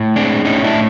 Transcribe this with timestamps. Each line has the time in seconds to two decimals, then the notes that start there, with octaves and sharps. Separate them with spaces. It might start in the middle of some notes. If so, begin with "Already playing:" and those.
Already playing: A2
0.16 G#3 C4 D4
0.45 A2 C#4 D#4
0.64 D4 E4
0.74 A2